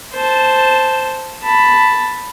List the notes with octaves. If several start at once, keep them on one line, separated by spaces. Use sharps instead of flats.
C5 A5
A5 B5